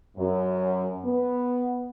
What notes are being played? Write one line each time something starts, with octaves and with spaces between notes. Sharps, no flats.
F#2
B3